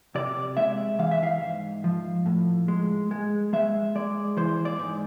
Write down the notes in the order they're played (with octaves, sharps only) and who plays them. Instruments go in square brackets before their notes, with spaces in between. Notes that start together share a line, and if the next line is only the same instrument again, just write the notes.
[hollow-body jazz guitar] C3 D5
G#3 E5
E3 F5
E5
F5
G#2
F3
A2
G#3
G#3
G#3 E5
G#3 D5
E3 C5
D5
G#2